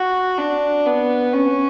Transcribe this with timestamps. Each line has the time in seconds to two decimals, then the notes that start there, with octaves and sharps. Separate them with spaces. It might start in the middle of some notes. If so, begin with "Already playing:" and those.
Already playing: F#4
0.38 D4
0.86 B3
1.33 C#4